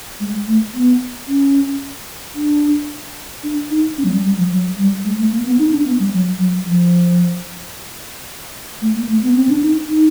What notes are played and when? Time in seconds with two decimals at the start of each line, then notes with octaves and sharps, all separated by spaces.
0.20 G#3
0.47 A3
0.74 B3
1.28 C#4
2.35 D4
3.43 D4
3.70 D#4
3.97 C#4
4.04 F#3
4.11 G3
4.24 G3
4.37 F3
4.51 F#3
4.77 G3
5.05 G#3
5.18 A3
5.32 A#3
5.45 B3
5.59 D#4
5.72 D4
5.85 B3
5.99 G3
6.13 F#3
6.39 F#3
6.66 F3
8.82 A3
8.95 A#3
9.09 A3
9.23 B3
9.36 C4
9.49 D4
9.62 D#4
9.90 D#4